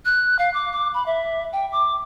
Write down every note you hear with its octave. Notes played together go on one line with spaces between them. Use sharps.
F#6
F5
D6
D6
B5
E5
G5
D6